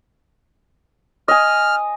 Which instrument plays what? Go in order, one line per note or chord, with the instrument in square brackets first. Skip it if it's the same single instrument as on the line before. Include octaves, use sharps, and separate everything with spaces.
[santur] D#5 G#5 [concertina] F6